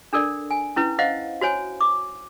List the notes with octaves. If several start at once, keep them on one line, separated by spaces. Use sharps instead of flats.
D4 A4 A#4 D5
G#5
C#4 E4 B4
C5 D#5 F5 F#5
F#4 C5 C#5 G#5
D6